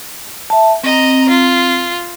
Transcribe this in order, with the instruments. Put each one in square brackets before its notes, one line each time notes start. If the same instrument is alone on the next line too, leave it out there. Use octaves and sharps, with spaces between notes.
[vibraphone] E5 A5
[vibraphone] C4 [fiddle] D#5 A#5
[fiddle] F4